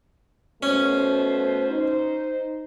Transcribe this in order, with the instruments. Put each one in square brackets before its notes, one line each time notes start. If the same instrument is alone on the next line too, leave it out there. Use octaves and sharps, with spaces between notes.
[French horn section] B2 A3 C5 [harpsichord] C#4
[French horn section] D#4 C5